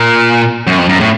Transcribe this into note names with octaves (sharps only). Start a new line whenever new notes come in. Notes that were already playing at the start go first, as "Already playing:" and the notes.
Already playing: A#2
F#2
F2
F#2
A2